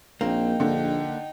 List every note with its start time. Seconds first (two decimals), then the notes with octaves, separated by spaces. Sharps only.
0.21 A#1 A#3 C4 D#4 G5
0.60 A#1 D3